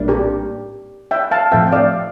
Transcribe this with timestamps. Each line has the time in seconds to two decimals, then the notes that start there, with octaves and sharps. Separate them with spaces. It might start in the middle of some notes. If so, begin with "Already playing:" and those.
Already playing: A#1 A2 G3 A#3 D4
0.08 G4 A#4
1.11 E5 G5
1.31 F5 A5
1.51 A2 F3 A3 C4 E5 G5
1.67 G5
1.72 D5 F5